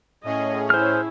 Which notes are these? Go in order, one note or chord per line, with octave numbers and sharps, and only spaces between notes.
A2 C#4 G#4 D#5
E4 C5 F6